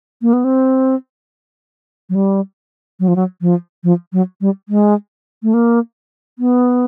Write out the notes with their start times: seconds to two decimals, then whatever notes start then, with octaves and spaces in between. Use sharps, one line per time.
0.22 A#3
0.33 B3
0.44 C4
2.09 F#3
2.15 G3
3.00 F#3
3.08 F3
3.16 F#3
3.41 F3
3.84 F3
4.13 F#3
4.41 G3
4.69 G#3
5.43 A3
5.54 A#3
6.39 B3